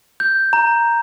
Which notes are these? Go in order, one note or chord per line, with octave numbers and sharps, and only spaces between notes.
G6
A#5